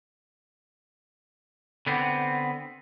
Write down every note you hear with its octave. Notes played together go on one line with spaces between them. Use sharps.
D3 B3 C4